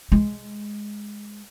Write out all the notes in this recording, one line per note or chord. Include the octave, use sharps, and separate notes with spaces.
G#3